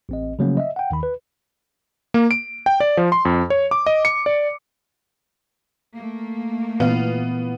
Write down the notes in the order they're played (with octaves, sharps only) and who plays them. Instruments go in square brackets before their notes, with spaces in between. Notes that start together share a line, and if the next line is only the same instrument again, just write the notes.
[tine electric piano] A1 C4 D#5
C#3 F3 F#3 A3 A#3 C#4
D#5 E5
F#5 G5
D#2 D#3 B5
B4
[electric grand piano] A#3
D7
G5
D5
F3
C6
F2
C#5
D6
D#5
C#7
D5
[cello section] A3 A#3
[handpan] A#2 E3 F5 [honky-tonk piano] B3